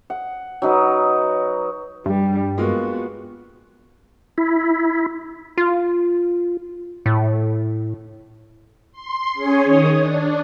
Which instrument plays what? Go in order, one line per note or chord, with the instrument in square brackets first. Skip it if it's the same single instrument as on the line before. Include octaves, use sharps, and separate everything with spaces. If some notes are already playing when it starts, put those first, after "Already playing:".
[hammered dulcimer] F#5
F#3 D#4 B4
[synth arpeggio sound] G2 [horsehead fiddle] G3
[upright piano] G#3 A#3 F4 [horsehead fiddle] B3 F#4
[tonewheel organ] E4
[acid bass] F4
A2
[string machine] C6
C#4 G#4 C#5
D#3 C#5 D#6
D4